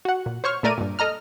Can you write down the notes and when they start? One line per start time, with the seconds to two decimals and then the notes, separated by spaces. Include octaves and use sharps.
0.05 F#4 F#5
0.26 A#2
0.44 C5 C#5 C#6 F6
0.63 A#2 A3 A#4 D5 D#7
0.78 G2 A#2
0.99 A4 D#5 A#5 F6